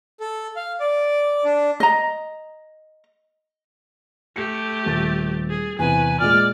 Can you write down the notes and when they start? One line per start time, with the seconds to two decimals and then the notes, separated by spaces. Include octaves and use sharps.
0.20 A4
0.56 F5
0.80 D5
1.45 D4
1.80 D#5 A#5
4.36 A3 G4 C#7
4.86 D#1 A6
5.49 G#4
5.79 E2 C3 B4 G#5
6.20 A#2 G#3 D5 F6